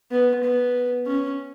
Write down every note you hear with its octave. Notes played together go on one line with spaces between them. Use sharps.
B3
B3
C#4